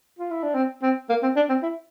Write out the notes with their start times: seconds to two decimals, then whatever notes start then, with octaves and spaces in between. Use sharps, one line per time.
0.19 F4
0.31 E4
0.43 D4
0.55 C4
0.82 C4
1.10 A#3
1.23 C4
1.36 D4
1.49 C4
1.63 E4